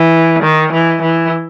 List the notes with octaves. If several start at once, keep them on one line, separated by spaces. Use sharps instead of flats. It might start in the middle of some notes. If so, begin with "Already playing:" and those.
Already playing: E3
D#3
E3
E3